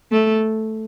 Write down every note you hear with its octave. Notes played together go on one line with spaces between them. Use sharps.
A3